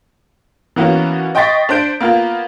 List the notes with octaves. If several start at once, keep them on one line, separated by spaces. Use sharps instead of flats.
E3 A#3 B3 C#4 F#4
D#5 G5 C6 C#6 A6 B6
D4 C5 G6 D7
A#3 B3 F4